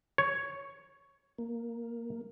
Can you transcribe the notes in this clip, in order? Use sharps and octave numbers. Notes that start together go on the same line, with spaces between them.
C#5
A#3